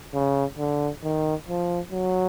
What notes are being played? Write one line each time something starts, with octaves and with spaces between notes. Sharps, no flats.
C#3
D3
D#3
F3
F#3